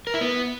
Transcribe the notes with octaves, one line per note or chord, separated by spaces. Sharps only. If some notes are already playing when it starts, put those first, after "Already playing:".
A#4
E4
B3